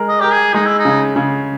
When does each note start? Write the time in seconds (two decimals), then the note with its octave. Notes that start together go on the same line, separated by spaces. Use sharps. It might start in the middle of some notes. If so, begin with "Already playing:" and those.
Already playing: G#3 A#4
0.09 D#5
0.21 G4 A#4
0.32 G#4
0.54 G#3 D#4
0.66 E4
0.78 D#4
0.85 C#3
1.16 C#3